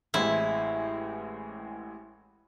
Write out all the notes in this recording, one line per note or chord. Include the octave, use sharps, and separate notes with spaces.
A1 A2 E3 G#3 C4 E4